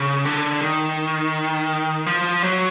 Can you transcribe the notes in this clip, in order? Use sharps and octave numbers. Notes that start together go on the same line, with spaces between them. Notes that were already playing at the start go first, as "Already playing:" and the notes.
Already playing: C#3
D3
D#3
F3
F#3